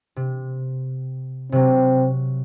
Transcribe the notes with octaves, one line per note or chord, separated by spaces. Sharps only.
C3
C3 F#3 C4